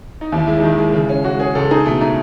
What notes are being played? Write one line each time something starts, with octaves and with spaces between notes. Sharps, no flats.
D#4
D#2 E4
G#3 E4
D#3 D#4
E4
G#3
C#3
C#4
G#3 F#4
C#4 G#4
C#2 A4
D#4 G#4
B2 A3
A3 D#4